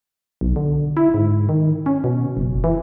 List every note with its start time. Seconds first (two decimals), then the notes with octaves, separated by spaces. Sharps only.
0.41 B1
0.56 D3
0.97 E4
1.14 G#2
1.49 D#3
1.86 C#4
2.04 B2
2.37 F#1
2.64 E3